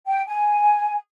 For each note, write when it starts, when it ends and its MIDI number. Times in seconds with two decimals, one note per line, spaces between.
0.06 0.21 79
0.27 0.95 80